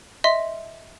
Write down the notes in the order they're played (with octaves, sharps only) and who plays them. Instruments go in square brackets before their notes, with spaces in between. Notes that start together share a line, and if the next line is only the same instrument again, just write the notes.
[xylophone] D#5 E5 C6